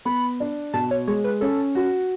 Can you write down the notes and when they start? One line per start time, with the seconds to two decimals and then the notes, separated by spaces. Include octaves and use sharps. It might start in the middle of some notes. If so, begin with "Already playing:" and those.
0.05 B3 B5
0.40 D4
0.73 B2 A5
0.91 C#5
1.07 G#3 C#5
1.24 B4
1.41 C#4 A4
1.75 F#4